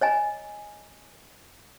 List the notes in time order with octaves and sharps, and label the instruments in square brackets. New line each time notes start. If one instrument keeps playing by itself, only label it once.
[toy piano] C#5 D#5 G#5 A#5